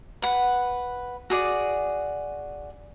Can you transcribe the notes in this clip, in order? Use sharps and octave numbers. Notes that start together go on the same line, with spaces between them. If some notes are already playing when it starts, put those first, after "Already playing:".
B4 F#5
F#4 G#4 D5